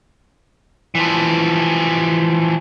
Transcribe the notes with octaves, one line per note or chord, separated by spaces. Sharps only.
E3 F3